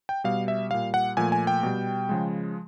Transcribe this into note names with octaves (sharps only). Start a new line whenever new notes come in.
G5
B2 G3 F5
E5
A#2 G3 F5
F#5
A#2 F3 A3 G#5
G#5
G5
B2 G3
C#3 F3 G#3